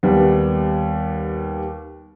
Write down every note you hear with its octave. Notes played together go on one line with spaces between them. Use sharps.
D#2 G3 B3